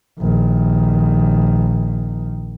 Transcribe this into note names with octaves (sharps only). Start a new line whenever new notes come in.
A#1 D#3